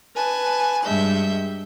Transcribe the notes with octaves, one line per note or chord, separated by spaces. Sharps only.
B4 G#5 A5
G2 G#3 E5 G6